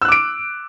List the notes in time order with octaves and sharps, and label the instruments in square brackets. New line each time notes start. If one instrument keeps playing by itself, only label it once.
[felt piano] E6
F#6
D6
D7